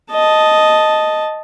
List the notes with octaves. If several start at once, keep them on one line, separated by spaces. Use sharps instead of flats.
D#5 A5